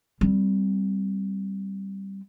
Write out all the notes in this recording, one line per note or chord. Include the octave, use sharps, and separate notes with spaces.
G3 C4